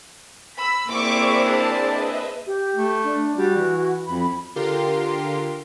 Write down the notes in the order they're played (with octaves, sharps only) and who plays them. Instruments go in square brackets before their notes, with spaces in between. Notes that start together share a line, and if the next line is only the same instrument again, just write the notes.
[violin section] B5 E6
[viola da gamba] A#3 C4 E4 [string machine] G#4 C5 D5 [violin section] C#6 D6
[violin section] D4 A5
[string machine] B4 D#5 E5
[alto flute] G4
[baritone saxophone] A3
[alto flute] D4
[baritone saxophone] G3 [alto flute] F#4
[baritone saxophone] E3
[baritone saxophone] F2 [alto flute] B5
[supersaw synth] D3 F4 G4 A#4 C6